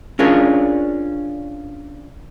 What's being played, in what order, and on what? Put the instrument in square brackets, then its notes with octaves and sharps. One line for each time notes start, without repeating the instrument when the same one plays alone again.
[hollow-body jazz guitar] C#4 D4 F4 G#4 A#4 C#5